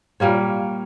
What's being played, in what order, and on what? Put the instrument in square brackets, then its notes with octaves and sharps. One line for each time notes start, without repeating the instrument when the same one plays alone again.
[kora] A#2 G3 A#3 C#5